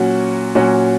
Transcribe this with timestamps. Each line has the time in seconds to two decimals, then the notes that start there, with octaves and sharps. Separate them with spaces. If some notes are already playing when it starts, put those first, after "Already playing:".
Already playing: A#2 F#3 C#4 F#4
0.55 A#2 F#3 C#4 F#4